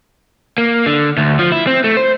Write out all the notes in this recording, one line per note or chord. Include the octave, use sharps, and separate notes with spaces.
A#3
D3
D2
F3
E4
C4
A3
C5